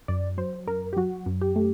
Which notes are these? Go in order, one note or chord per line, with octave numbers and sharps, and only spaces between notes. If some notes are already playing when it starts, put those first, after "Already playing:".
F#2 D5
F#3 C5
F#2 A#4
G4
F#3 F#4
F#2
G4
A3